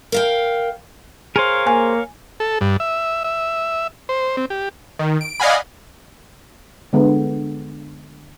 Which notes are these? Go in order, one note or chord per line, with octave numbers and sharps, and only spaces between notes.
A#4 F5 G5
G#4 A#4 C5 C#5 F5
A#3 G#5
A4
G2
E5
E5
C5
C4
G4
D#3
D7
D5 D#5 F5 F#5 G#5 B5
D3 G#3 B3